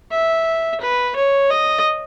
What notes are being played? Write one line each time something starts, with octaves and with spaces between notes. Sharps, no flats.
E5
B4
C#5
D#5